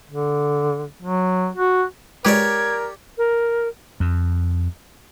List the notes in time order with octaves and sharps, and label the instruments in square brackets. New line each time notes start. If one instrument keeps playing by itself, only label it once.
[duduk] D3
F#3
F#4
[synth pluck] G#3 F4 B4 [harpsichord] G4 C#5 D5 [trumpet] A#4 [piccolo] G#6
[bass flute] A#4
[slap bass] F2